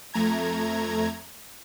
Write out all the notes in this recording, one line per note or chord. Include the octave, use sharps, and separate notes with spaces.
F2 A3 A#5 G#6